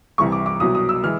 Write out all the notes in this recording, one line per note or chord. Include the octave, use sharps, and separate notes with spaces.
C2 C3 E3 G3 C#6
D6
D6
C2 B2 F#3 D#6
D#6
E6
E3 G#3 F6